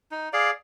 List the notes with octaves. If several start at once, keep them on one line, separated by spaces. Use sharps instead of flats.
D#4
G#4 D5 F5